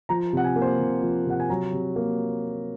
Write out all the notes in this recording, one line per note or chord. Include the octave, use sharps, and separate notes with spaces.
F3 A#5
C3 F#5
G#5
A#3
C5
C3
F3
C3 F#5
G#5
F#3 A#5
C3
A#3